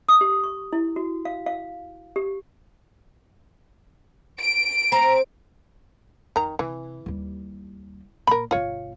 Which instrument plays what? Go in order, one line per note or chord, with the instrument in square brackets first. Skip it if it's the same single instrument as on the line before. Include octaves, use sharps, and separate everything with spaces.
[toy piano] D#6
G4
C#6
E4
F#4
F5
F5
G4
[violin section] D7
[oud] C4 [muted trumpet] A#5
[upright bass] F2 [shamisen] D#3 A#5
[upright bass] C3 [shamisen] E3
[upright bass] D#2 G3
[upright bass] A#2 [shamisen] A#4 B5
[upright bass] G1 B2 [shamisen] F4 C#5